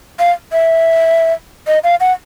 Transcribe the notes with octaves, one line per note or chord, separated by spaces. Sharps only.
F5
E5
D#5
F5
F#5